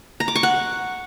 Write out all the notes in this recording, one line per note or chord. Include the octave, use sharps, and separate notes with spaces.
A#5
D6
C#6
F#5